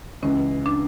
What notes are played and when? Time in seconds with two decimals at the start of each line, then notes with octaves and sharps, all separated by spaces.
0.22 C#2 C#3 E3 C#4
0.66 D4